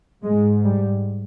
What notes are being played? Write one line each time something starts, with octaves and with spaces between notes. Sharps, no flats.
G#2 G#3
G3